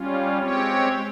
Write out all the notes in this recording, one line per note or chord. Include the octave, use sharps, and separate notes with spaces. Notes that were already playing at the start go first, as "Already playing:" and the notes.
Already playing: G3 C#4 F4
G#3 C4 G4 C#5